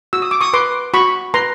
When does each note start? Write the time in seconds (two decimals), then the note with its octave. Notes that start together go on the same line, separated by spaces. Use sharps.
0.13 F#4 E6
0.22 D#6
0.31 D6
0.41 C#6 D#6
0.53 B4 C6 D6
0.94 F#4 B5 C#6
1.34 B4 A#5 C6